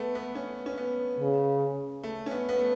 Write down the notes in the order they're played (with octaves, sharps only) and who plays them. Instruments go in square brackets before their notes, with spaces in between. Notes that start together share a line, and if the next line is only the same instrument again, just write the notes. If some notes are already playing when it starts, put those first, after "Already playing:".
Already playing: [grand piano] A3 B3
B3
C#4
C#4
B3
[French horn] C#3
[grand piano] A3
C#4
B3
B3
A3